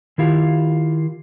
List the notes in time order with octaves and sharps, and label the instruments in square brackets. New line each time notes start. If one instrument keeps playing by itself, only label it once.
[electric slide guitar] D#3 E4 F4 G4